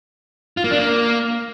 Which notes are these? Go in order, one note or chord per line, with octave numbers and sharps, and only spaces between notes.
F4
A#3
D4
A#3